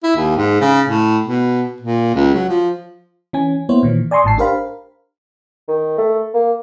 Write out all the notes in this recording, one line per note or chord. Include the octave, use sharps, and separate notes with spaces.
E4
D#2
G#2
C#3
A2
B2
A#2
C#2
F#3
F3
E3 C#4 G#5
A#3 B3 E4 C5 C#5
A#2 D#3 E3
D5 G#5 A#5 C6 C#6 D#6
G#1 A2 A5 C7
D4 G4 A#4 C5 F5 B5
D#3
A3
A#3